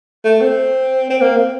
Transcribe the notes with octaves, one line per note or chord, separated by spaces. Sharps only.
A3
C4
C4
A#3
C4